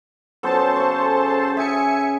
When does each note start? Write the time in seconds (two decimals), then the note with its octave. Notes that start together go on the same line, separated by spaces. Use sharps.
0.43 F#3 B3 C#4 A4 C5 A5
0.76 C#3 C#6
1.57 G#4 E5 G#5 C#7